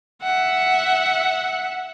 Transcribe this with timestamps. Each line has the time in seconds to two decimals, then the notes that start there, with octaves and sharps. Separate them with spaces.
0.23 E5 F#5